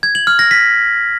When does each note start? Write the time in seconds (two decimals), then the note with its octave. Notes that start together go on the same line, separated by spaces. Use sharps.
0.03 G#6
0.15 F#7
0.27 F6
0.39 A#6
0.51 B6